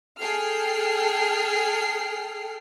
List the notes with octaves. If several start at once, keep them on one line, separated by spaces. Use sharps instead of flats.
G#4 A4 G5 F6 C7